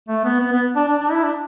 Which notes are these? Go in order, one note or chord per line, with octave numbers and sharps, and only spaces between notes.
A3
B3
B3
B3
D4
D4
D4
E4
D4